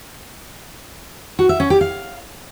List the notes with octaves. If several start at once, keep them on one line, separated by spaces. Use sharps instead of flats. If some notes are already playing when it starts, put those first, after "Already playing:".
F#4
E5
C#4
G4
F5